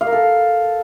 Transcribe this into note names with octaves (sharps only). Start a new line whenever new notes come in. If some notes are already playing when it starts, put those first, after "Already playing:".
F5
A#4
A4